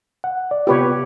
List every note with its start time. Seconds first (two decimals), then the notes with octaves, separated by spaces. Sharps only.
0.24 F#5
0.51 D5
0.67 C3 B3 F4 G4 B4 C#5